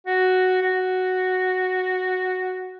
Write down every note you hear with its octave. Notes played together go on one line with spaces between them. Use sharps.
F#4
F#4